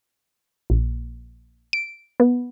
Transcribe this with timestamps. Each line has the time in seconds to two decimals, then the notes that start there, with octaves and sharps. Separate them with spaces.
0.70 A#1
1.73 D7
2.20 B3